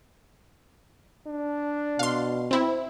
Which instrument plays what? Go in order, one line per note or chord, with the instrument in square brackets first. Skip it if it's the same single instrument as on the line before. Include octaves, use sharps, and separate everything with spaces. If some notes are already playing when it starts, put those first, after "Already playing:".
[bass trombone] D4
[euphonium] B2 [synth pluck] F5 C6
[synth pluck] C4 E4